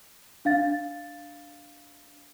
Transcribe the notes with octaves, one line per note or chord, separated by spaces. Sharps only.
D4 F5 A6